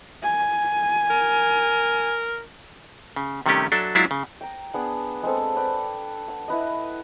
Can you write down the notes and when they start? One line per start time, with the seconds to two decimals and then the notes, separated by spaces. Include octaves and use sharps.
0.23 G#5
1.10 A#4
3.16 C#3
3.46 C3 D#3 G3 A3 C#4 G4
3.72 F#3 D4 A4 E5
3.95 F#3 G#3 D4 E4 F4
4.11 C#3
4.41 G5 A#5
4.74 B3 D4 G#4 F#5
5.23 G#3 C4 A4
5.56 B4 D5 G5
6.28 F#5
6.48 E4 B4 D#5